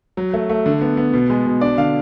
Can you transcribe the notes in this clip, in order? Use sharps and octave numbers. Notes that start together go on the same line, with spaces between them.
F#3
A3
A3
D3
B3
B3
B2
G#3
B2
D4 D5
D3 F5